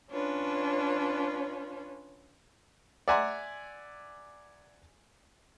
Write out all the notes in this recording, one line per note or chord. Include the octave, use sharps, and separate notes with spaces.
C#4 D4 F4 B4 C#5
D5 E5 F#5 G#5 A#5 C6